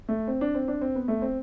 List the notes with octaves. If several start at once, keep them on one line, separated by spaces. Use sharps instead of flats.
A3
C4
D4
C4
D4
C4
B3
A3
C4